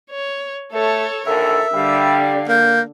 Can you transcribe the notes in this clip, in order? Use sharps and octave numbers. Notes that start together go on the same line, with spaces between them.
C#5
A3 A4 C#5
A#1 D#2 D3 A4 A#4 E5
D3 G3 F5
A#3 G6